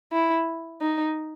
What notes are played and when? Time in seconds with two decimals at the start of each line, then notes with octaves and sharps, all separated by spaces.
0.12 E4
0.81 D#4